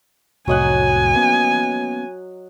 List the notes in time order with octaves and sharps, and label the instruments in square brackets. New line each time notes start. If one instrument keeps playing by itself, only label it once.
[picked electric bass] F1 C2 A2 [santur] F#3 D#5 F#5 [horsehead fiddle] G#5
[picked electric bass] A#3 B3 C#4